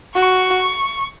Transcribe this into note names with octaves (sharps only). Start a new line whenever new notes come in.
F#4 C#6